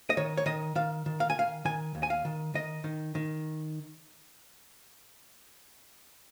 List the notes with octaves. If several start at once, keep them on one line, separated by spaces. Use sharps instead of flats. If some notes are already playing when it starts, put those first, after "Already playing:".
D#5
D#3 C#5
C#5
D#3 D#5
D#3 F5
D#3
F5
G#5
D#3 F5
D#3 G#5
D#2
G#5
F5
D#3
D#3 D#5
D#3
D#3